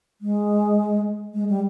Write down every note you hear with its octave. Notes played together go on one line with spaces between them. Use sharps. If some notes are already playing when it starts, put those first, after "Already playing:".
G#3
G#3
G3